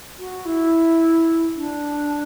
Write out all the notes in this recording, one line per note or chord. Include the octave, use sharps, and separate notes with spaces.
F#4
E4
D4